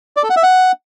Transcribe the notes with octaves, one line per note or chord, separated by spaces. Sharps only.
D5
A4
F#5
E5
F#5